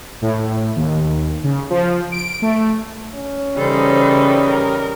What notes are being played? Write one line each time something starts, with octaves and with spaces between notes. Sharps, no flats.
A2
D#2
C#3
F3
D7
A3
C#4
C#3 E3 G3 D#4 A4 C5
A#4